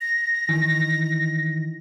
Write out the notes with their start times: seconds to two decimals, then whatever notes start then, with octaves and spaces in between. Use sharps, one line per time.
0.01 A#6
0.49 D#3 E3